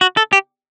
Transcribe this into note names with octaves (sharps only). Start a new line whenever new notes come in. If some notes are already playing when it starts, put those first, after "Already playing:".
F#4
A4
G4